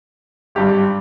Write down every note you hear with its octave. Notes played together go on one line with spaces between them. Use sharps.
G#1 G2 G3 G4